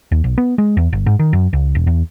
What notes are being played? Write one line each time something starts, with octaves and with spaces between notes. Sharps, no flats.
D#2
B1
B3
G#3
E2
G1
G#2
D#3
F#2
C#2
E1
E2